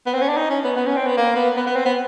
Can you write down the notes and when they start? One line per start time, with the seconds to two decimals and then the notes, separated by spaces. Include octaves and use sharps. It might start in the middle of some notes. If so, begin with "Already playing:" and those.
0.06 B3
0.14 C4
0.21 C#4
0.29 D4
0.37 D#4
0.50 C#4
0.64 B3
0.76 B3
0.86 C#4
0.96 C4
1.06 B3
1.17 A#3
1.36 B3
1.57 B3
1.67 B3
1.75 C4
1.85 B3